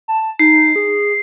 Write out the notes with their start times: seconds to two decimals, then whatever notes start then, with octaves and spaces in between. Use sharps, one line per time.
0.08 A5
0.39 D#4 C7
0.76 G#4